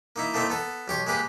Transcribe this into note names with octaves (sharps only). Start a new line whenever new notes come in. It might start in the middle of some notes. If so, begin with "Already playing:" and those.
A#3 D#4 E4
A3 A#3 C4 D#4 E4
B3 A4
B1 G4 C#5
G#3 A#3 G4 B4